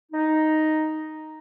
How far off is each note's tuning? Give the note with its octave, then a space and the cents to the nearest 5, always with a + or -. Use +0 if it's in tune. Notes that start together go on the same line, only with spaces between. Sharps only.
D#4 +0